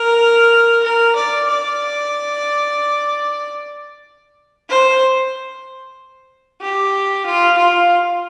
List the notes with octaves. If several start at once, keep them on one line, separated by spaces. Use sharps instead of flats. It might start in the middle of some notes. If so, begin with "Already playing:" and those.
Already playing: A#4
A#4
D5
D5
C5
G4
F4
F4